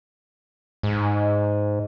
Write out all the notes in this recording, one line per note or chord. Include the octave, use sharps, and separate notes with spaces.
G#2